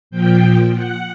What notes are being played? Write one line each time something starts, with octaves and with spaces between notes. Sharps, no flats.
A#2 F3 G5
F#5